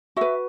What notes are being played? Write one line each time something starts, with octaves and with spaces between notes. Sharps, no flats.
F#4 B4 E5